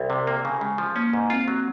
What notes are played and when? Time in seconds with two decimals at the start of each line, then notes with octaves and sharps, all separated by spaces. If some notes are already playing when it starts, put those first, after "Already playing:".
Already playing: C2
0.10 C3
0.27 A#3
0.45 C#3
0.61 C#3 G#3
0.78 F3
0.95 A#3 C#4
1.13 G#2
1.30 C4 F4
1.48 F#3